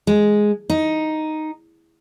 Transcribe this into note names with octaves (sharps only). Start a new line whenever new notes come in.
G#3
D#4